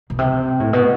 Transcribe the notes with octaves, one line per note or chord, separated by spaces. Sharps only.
B2
C3
A2
B2